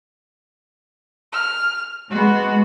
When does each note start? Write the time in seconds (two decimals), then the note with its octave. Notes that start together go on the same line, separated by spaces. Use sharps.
1.33 F6
2.11 G#3 B3 F#4